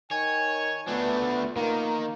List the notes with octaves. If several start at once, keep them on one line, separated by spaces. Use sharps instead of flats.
D#3 C#5 G#5
A3 B3 D4 F4
D#3 A#3